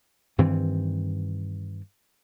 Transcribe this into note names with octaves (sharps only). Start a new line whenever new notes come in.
G2 D#3 E3 C4